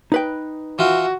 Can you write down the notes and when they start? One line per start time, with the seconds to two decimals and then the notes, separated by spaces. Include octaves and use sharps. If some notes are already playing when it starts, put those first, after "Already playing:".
0.12 D#4 B4 G5
0.79 E3 F4 F#4